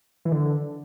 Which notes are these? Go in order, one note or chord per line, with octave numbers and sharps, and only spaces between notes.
E3
D3